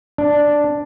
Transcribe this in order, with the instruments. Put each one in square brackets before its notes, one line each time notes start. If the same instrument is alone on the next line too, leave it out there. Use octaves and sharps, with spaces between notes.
[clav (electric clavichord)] D4